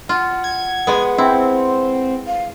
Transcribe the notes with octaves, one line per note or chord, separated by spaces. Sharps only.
F4 F#5
G#6
G#3 B3
C4 E4
F5